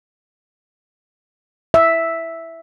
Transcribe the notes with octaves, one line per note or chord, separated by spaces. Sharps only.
E5